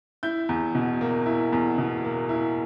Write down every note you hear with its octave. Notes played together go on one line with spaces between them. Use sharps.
E4 G6
E2
B2
A#3
E4
E2
B2
A#3
E4